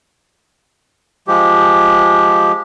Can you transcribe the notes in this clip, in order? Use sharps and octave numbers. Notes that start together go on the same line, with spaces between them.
F3 G#3 G4